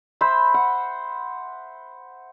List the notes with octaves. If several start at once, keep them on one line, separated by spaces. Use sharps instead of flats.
C5 E5 B5
F#5